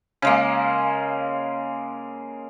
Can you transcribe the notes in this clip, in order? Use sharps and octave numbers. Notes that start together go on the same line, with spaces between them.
C#3 G#3 A#3